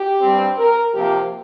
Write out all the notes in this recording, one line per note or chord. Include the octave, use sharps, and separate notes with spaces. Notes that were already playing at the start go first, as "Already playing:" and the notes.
Already playing: G4
G2 G3 C4
A#4
C3 F3 A#3 G4